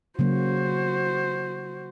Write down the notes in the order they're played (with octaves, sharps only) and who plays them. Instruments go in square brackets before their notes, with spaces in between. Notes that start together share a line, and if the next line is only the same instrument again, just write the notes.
[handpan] C#3 F#3 A#3 [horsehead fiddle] F#4 C5